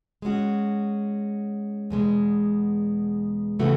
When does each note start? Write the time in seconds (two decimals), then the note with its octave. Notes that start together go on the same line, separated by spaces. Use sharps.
0.22 G#3 C#4 F#4
1.90 E2 B2 G#3
3.59 C#3 E3 A3 C#4 F#4